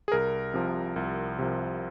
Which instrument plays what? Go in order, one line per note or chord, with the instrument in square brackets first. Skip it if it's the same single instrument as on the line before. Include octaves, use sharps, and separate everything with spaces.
[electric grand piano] G#4
C2 A#4
C3 F3
C2
C3 F3